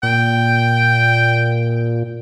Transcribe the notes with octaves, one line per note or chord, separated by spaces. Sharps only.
A#2 G5